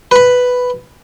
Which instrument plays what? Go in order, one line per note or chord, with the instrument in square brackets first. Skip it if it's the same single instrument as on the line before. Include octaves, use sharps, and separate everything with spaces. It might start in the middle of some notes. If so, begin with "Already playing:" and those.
[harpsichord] B4 B5